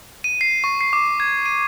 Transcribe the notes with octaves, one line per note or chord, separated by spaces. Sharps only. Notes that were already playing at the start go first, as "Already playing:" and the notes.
D#7
C7
C#6
C7
D6
G#6
D#7